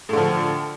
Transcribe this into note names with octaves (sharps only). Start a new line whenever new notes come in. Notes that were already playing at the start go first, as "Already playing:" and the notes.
A2 D3 F3